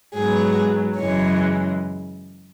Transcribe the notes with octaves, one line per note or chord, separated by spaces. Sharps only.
G#2 F#3 B3 G#4
F#2 C#3 E3 G#3 C#5